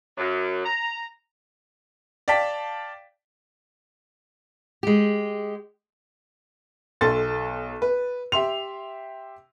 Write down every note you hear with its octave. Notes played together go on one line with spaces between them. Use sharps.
F#2
A#5
D5 F5 G5 A5 B6
G#3 G4
B1 A4 C6 A6
B4
G4 E5 C6 F7